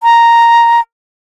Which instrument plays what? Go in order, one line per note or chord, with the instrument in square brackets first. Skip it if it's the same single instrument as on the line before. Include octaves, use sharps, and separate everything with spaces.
[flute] A#5